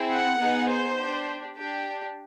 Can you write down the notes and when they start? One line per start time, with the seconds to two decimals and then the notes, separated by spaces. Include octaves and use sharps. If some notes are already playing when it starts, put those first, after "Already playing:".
Already playing: C4 E4 G#4
0.11 F#5
0.40 B3 D#4 G#4
0.70 C5
0.98 D4 G4
1.57 D4 G4